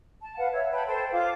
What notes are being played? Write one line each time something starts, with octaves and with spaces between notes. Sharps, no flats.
A5
B4 F5 F#5
C#5 E5
B4 G5 A5 B5
A4 C5 G5 A5
F4 F5 D6